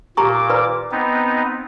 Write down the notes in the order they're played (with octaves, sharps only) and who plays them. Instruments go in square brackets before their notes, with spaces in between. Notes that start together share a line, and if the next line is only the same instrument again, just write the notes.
[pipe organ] A#2 D6 [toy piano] G4 A#5 C#6
[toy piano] B4 D5 B5
[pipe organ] B3 C4 D#4